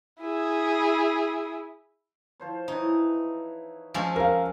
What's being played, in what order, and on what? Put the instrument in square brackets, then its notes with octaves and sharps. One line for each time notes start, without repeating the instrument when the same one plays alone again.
[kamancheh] E4 G#4
[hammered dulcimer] F3 C5 C#5
[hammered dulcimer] E3 C#5 [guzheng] D#4
[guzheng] F3 G#3 C#4 [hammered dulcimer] A4 C5
[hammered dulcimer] C#3 [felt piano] A#4 F5